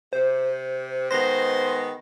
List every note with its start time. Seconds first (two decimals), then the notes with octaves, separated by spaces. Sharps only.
0.13 C3 C5
1.11 D#3 G#3 B3 C5 A#6